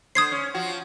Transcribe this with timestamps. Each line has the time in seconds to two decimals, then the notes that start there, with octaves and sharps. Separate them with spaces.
0.15 D3 C5 D#6 G#6 C7
0.32 C#4
0.54 F3 F#4